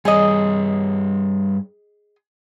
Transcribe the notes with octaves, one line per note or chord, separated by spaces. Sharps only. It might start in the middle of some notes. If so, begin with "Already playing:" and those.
G2 G3 G#4 C#5 D#5